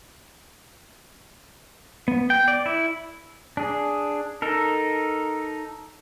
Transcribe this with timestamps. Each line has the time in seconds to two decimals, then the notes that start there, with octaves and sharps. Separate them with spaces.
2.08 B3
2.30 G5
2.48 D5
2.66 E4
3.57 D4 G#4
4.42 D#4 A4 A#4